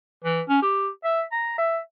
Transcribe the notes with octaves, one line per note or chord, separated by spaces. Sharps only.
E3
C#4
G4
E5
A#5
E5